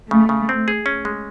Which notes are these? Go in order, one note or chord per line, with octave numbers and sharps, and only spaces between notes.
C#3 A3
C#3
C4
G#4
C#4
G#3